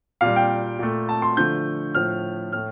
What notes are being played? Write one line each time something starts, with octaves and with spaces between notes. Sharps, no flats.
A#2 G3 F5
G5
A#2 A3
A5
C6
D3 F3 A3 G6
A2 F3 A3 F6
A2 A3 F6